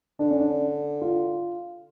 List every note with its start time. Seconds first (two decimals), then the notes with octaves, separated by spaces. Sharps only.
0.19 D3 D4
0.30 C#4
0.40 D4
1.02 F4